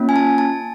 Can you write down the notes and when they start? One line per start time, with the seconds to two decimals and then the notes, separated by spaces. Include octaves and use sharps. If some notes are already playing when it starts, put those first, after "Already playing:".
Already playing: A#3 C#4 F4
0.09 G#5
0.16 A5
0.38 A5